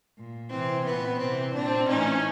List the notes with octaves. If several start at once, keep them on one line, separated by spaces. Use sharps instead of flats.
A#2
C3 E3 C4
A#2 B3
C3 E3 C4
A#2 C4 D4
A2 E3 C#4 D#4